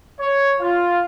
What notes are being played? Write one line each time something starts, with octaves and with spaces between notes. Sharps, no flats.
C#5
F4